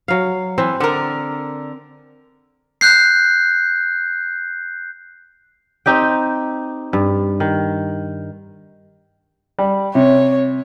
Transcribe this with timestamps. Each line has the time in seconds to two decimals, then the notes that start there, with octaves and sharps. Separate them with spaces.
0.08 F#3 F5
0.58 E3 C4
0.80 D3 A#4 F#5
2.81 F#6 G6 C7
5.86 C4 D#4 G4 G5
6.93 G2
7.40 D#3
9.58 G3
9.95 C3 C#5